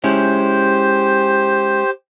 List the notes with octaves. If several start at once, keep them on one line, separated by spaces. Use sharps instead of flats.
G#3 C#4 E4 G4 C5